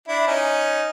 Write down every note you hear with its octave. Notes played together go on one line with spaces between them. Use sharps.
D4 E4
C#4 D#4